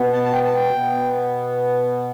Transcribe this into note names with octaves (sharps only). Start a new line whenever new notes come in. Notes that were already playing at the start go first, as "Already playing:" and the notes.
Already playing: B2 B3
A5
A5
G5
A5
G5
B2 B3